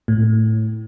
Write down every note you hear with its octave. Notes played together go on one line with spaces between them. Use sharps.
A2